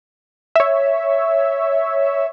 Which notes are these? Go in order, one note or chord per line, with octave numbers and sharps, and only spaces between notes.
C#5 E5